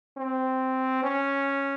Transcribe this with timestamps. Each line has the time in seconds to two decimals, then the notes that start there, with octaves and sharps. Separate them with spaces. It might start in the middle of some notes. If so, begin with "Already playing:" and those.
0.17 C4
1.03 C#4